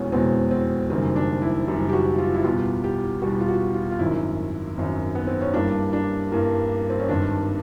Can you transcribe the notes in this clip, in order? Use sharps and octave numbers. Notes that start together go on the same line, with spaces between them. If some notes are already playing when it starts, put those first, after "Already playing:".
Already playing: F1 E2 B2 G#3 B3 C#4
F1 E2 B2 G#3 B3 C4
C4
F#1 F#2 D#3 G3 C4
D4
E4
F#1 F#2 D#3 G3
G4
F#4
F4
E4
E2 B2 G3 B3 F4
G4
E2 B2 G3 B3 F#4
F4
F#4
F4
F4
G#1 F#2 D#3 E4
G#1 F#2 D#3
B3
C4
C#4
G2 E3 G3 A#3 D4
D4
G2 E3 G3 A#3
C4
C#4
G#1 G2 D#3 D4